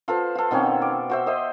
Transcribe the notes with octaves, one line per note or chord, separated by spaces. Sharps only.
F4 A4 B4 C5
F4 A4
B2 D#3 C4 C#4
D6
F#4 C5 E5
C5 D#5 E5 C6